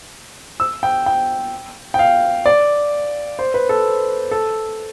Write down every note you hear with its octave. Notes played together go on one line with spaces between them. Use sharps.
E6
G5
G5
G5
F5
D5
C5
B4
A4
A4